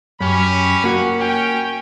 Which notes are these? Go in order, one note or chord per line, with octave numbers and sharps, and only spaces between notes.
F#2 C#4 G4 B5
A#3 F#4
C#4 G5